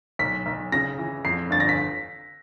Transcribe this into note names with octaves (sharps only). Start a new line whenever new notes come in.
B1 B6
B1
C#3 A#6
E3
F2 C7
G1 A6
A#6
B6